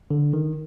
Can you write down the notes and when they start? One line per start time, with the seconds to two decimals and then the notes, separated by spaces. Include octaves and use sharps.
0.11 D3
0.33 D#3